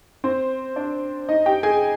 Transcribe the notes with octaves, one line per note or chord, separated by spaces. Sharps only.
C4 C5
D4 D5
D#4 D#5
G4 G5
G#4 G#5